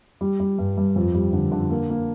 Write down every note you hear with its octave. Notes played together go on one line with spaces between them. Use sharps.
G3
G3
G2
G2
F2
G3
D3
D3
A#3
A#3